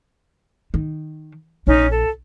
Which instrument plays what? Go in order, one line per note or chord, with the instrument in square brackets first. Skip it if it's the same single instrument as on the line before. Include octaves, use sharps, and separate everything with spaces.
[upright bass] D#3
[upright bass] A#1 [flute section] C#4 D#4
[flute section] A4